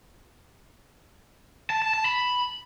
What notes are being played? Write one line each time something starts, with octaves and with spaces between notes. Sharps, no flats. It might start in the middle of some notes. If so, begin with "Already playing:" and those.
A5
A5
A5
B5